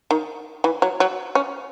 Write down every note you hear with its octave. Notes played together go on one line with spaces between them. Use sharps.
D#3
E3
F#3
F#3
C#4